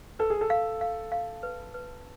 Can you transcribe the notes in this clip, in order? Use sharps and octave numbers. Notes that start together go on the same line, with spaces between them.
A4 B4
G#4
A4
F5
F5
F5
B4
B4